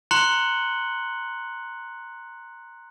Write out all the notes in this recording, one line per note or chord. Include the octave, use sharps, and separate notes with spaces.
A#5 C6 F#6 C#7 F#7 G7